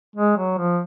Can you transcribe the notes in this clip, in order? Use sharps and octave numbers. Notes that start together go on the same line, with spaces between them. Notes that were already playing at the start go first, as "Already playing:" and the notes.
G#3
F#3
F3